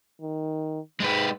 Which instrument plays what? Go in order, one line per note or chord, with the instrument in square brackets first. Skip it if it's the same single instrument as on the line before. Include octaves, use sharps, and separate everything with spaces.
[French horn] D#3
[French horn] G#2 [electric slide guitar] G#3 D#4 B4